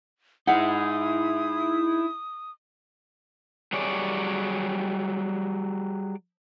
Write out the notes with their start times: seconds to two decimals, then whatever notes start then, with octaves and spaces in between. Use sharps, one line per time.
0.47 D#4 E4 G#4 F#5 D#6
3.73 F#3 G3 G#4 C#5 D5